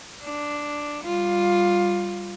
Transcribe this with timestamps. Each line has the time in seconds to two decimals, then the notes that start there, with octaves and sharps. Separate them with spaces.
0.24 D4
1.03 G3 F4